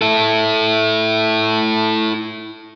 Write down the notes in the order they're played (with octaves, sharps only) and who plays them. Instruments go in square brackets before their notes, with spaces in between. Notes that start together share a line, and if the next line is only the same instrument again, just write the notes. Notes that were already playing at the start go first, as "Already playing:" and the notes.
[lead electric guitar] E4 A4